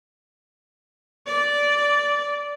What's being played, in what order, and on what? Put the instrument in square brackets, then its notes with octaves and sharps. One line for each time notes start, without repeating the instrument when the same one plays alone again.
[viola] D5